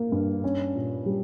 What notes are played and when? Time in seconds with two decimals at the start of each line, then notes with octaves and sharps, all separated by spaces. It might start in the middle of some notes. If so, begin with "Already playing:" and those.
Already playing: A#3
0.12 G2
0.44 C#4
0.75 A#2
1.06 G3